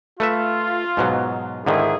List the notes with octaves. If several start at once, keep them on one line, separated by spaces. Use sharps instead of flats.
A3 F4 B4 E5
G#2 B2 F#3
G#2 D3 D#3 E4 G#4